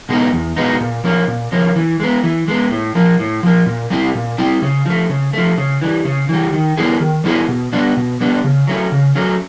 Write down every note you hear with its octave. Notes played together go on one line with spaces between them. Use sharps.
B2 G#3 B3 D#4
E2
B2 G#3 B3 D#4
A#2
F3 A#3 C#4
A#2
F3 A#3 C#4
E3
G#3 B3
E3
G#3 B3
A2
F3 A#3
A2
F3 A#3
A#2
G3 C4 E4
A#2
G3 C4 E4
C#3
F3 A3
C#3
F3 A3
C#3
E3 G3
C#3
E3 G3
D#3
G3 B3 E4 G#4
D#3
G3 B3 E4 G#4
B2
G3 B3 D4
B2
G3 B3 D4
C#3
F#3 A3 C#4
C#3
F#3 A3 C#4